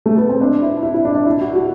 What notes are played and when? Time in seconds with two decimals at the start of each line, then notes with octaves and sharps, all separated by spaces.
0.06 A3
0.17 B3
0.29 C4
0.41 D4
0.62 E4
0.83 E4
0.94 E4
1.05 D4
1.15 D4
1.26 E4
1.41 F#4
1.55 F#4